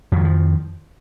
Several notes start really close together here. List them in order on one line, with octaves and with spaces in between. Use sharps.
F2 D#3 F#3 F3